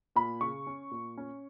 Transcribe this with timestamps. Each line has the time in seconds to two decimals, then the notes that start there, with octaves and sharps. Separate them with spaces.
0.16 A#2 B5
0.41 C#3 C#6
0.67 C#4
0.91 A#2
1.18 C#4